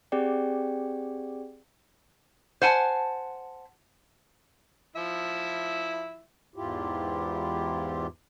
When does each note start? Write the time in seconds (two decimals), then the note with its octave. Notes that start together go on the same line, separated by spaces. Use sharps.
0.12 C4 G4 G#4 D5 G5
2.62 C5 F#5 G#5 A5
4.96 F3 E4 E5
6.56 E2 G#2 E4 F4 G4